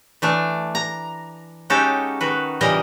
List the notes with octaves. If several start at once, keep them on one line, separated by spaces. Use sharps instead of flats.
E3 A3 D4
A#5
G#3 C#4 D#4 F#4 G4 A4
D#3 F#4 B4
A#2 C#3 E3 G3 A#4 D#5